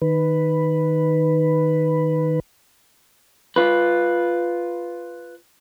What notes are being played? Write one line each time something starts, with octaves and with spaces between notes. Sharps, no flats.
D#3 B4
F4 B4